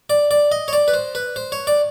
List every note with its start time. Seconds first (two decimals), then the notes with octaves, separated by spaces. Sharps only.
0.10 D5
0.31 D5
0.52 D#5
0.68 C#5
0.73 D5
0.88 B4
0.94 C5
1.15 B4
1.36 C5
1.52 C#5
1.67 D5